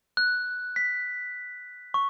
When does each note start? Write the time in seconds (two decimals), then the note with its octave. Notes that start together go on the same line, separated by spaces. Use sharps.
0.17 F#6
0.76 B6
1.94 C#6